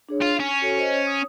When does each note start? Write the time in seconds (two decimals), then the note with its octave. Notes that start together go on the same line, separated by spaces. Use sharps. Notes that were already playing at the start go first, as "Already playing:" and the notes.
0.09 D4 G#4 C#5
0.22 F4
0.40 C#4 G#5 C#6
0.62 F#4 A4 C#5
0.77 C5 C#5 D#5
1.07 D#6